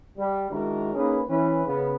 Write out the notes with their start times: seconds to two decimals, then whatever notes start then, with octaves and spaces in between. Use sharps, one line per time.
0.18 G3
0.51 D#3 G#3 D4 E4 F#4 A#4
0.95 A#3 C#4 D#4 G#4 B4
1.29 E3 C#4 B4
1.66 C#3 B3